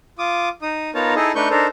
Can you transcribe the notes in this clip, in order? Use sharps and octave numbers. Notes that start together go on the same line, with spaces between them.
F4 D6 D#6
D#4 D#6
B3 D#4 F4 A#4 C#5 A5
D#4 E4 G#4 A4 D#5
A3 D4 D#4 B4 C#6 G6
D4 D#4 A4 A#4 C5